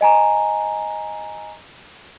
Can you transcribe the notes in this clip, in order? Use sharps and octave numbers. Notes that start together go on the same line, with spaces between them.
D#5 G#5 A#5